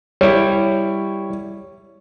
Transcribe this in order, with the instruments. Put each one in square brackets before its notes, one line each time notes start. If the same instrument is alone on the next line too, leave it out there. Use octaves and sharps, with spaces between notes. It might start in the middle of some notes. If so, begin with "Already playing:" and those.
[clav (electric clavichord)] G3 E4 [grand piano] C#5